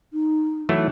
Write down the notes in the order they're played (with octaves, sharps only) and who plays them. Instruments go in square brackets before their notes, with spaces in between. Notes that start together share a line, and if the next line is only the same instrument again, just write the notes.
[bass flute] D#4
[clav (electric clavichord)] E3 F#3 A3